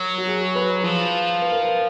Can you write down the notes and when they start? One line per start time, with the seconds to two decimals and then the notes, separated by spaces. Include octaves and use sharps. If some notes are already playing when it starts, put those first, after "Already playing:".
Already playing: F#3 A#4
0.18 F#4
0.27 G#4
0.55 B4
0.84 F3
1.42 B4
1.52 A#4
1.62 B4